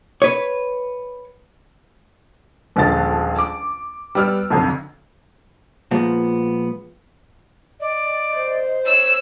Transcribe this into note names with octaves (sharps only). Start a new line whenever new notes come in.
B4 C#5
D#1 A#1 D3 G#3 A6
D6
G3 B3 D5 E6 F6
B1 F2 D3
A#2 F3 G#3 B3
D5 D#5
C5
C#5 E6